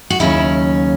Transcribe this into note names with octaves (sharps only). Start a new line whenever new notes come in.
F#4
D#2 C#3 F#3 C#4 E4